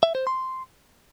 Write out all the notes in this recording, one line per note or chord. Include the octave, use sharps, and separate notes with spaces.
E5
C5
C6